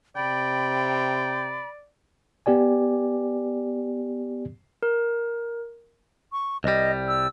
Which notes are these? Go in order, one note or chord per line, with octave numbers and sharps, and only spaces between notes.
C3 D5 G5 B5
B3 G4 D5 G#5
A#4
C#6
C2 G3 D#5
E6